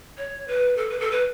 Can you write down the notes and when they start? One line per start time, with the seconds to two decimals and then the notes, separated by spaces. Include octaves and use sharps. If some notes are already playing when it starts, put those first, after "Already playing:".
0.18 C#5
0.48 B4
0.77 A4
0.90 B4
1.00 A4
1.11 B4